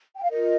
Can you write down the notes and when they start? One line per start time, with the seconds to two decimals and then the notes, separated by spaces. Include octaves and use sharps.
0.16 G5
0.23 F5
0.30 F4 A#4 D#5